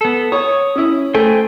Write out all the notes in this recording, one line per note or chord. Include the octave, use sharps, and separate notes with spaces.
B3 A4
C#5 D#6
C#4 E4
A3 C5 G5 G#5